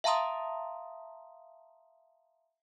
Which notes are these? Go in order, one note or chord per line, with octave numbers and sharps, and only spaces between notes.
E5 F5 A5 A#5 C6 D#6